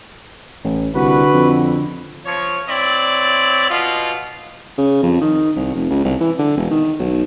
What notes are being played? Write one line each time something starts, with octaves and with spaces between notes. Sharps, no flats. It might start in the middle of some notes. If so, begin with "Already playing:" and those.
A1
C2 D3 F#4 B4
F2
F3 C#5
C4 E4 C#5 D5
B2 F4
C#3
F2
D#3
C2
F1
C#2
C2
E3
D3
E1
D#3
B1